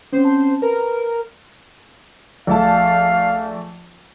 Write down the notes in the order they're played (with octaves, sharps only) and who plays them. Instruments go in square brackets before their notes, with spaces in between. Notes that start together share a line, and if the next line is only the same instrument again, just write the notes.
[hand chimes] C4 C#4 [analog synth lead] C5
[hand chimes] A5
[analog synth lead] A#4 [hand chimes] B4
[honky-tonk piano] A#1 A3 A5 [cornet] F5